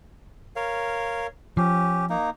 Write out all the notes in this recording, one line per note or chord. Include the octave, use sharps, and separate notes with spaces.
A#4 C#5 F5
F3 C#4 G4
A#3 D#4